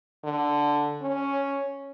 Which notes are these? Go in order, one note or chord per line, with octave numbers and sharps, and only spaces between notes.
D3
C#4